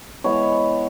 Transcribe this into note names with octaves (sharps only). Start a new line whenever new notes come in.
E3 G#3 B3 C#5